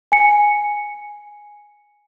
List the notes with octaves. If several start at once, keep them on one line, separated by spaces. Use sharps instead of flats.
G#5 C#7